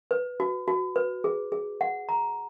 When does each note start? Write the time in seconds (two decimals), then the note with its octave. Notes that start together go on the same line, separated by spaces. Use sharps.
0.11 B4
0.40 F#4
0.68 F#4
0.96 B4
1.24 G#4
1.52 G#4
1.81 F#5
2.09 A#5